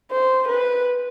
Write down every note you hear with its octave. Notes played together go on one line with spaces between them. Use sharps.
C5
B4